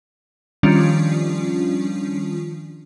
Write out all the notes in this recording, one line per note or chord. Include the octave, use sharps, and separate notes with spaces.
D#3 F3 G3 C#4 D4 F4